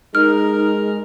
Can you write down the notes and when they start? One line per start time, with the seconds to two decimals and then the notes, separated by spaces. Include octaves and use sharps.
0.15 G#3 D#4 A#4 F6